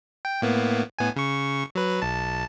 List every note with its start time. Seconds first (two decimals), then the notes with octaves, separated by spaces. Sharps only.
0.25 G5
0.42 A2 A#3 B3
0.99 A2 B3 G#5
1.16 C#3 C#6
1.75 F#3 B4
2.02 B1 A5